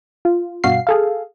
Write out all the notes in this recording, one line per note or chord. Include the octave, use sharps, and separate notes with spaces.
F4
G2 B2 F#4 F5 C7
G#4 A4 F5